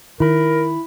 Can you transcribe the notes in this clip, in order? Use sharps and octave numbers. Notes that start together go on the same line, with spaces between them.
D#3 E4 A#4 B5